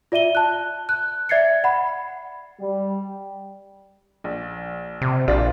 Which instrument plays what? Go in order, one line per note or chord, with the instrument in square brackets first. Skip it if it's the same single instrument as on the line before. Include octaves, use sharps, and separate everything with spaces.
[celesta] F4 D5 E5 D#7 G7
A5 F#6
F#6
D5 E5 G#6 A6 C7 C#7
F#5 B5
[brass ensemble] G3
[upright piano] A#1
[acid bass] C3
[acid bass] A#1 [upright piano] D4 F4 G4